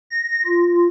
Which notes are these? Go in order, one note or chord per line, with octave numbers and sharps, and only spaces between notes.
A#6
F4